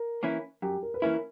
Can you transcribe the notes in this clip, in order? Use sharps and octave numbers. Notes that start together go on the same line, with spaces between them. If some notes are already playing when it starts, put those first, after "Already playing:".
Already playing: A#4
E3 A#3 C#4 E4
F#2 G4
A#4
B4
E3 A#3 C#4 E4 A#4